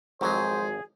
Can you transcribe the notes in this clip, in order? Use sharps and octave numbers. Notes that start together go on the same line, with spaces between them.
G#1 F2 F3 F#3 G#3 G#4 C5